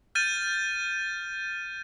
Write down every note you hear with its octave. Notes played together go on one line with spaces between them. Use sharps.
F6 G6 A6 D#7